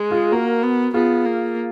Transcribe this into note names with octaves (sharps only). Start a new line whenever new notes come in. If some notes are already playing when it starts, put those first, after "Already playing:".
Already playing: G#3
F4 G#4
A#3 F#4 A#4
B3
B3 F4 G#4
A#3